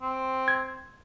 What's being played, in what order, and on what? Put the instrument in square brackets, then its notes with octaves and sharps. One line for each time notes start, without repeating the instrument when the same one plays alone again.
[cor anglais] C4
[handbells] G#6